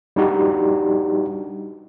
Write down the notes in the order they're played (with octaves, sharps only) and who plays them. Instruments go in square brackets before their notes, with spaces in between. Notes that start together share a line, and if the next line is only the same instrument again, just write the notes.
[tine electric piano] G3 D4 D#4 F#4 G4